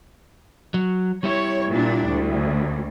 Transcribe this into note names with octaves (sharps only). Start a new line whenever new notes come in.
F#3
G3 E4 C#5
A#2 D4
D2